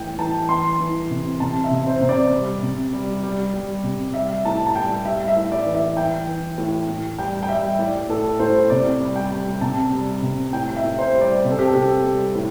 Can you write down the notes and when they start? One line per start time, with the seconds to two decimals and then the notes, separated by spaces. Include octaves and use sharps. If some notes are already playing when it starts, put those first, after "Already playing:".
Already playing: A2 E3 G5
0.18 E3 A5
0.49 E3 C6
0.80 E3
1.11 C3
1.40 C3 A5
1.64 E5
1.71 C3
1.87 C5
2.01 C3
2.09 D5
2.32 G3
2.63 C3
2.93 G3
3.24 G3
3.53 G3
3.83 C3
4.14 G3 E5
4.45 A2 A5
4.67 A5
4.75 G3 G5
5.05 G3 E5
5.28 E5
5.36 A2
5.52 D5
5.66 E3
5.75 E5
5.96 E3 G5
6.27 E3
6.58 A2
6.88 A2
7.19 G3 G5
7.43 G5
7.49 G3 E5
7.79 A2 D5
8.09 A2 A4
8.40 A2 C5
8.70 C3 D5
9.01 G3
9.16 G5
9.31 G3
9.61 C3 A5
9.92 G3
10.23 C3
10.53 A2 G5
10.76 E5
10.84 A2
10.99 C5
11.14 G3
11.21 D5
11.45 C3 C5
11.51 A4
11.59 G4
11.67 A4
11.74 C3 G4
12.05 G3
12.35 A2